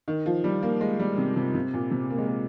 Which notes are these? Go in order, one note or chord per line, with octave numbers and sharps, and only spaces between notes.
D#3
F3
G3
A#3
G#3
G3
C3
C3
C3
A#2
C3
A#3
G#3
A#3